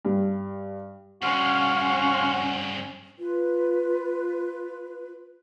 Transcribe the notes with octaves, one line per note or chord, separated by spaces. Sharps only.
G2
G2 C#3 C#4 F#4 F5 C6 F6
F4 B4